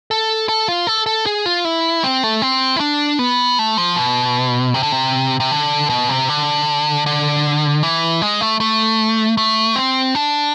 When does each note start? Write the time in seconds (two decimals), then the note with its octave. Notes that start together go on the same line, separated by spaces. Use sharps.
0.11 A4
0.49 A4
0.68 F4
0.87 A4
1.06 A4
1.26 G#4
1.46 F4
1.65 E4
2.04 C4
2.23 A3
2.42 C4
2.76 E4
2.80 D4
3.19 B3
3.59 A3
3.78 F3
3.96 B2
4.74 C3
4.83 D3
4.92 C3
5.40 C3
5.51 D3
5.90 B2
6.09 C3
6.29 D3
7.06 D3
7.83 E3
8.22 G#3
8.41 A3
8.60 A3
9.37 A3
9.76 C4
10.15 D4